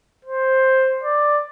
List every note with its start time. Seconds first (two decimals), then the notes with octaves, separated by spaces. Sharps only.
0.25 C5
1.03 D5